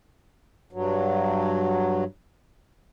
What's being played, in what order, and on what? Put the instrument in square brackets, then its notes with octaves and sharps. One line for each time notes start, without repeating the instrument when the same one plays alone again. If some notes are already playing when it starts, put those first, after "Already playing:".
[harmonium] G2 F#3